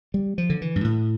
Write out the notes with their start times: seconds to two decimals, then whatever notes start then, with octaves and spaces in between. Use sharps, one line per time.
0.14 G3
0.38 F3
0.50 D3
0.62 E3
0.76 G2
0.84 A2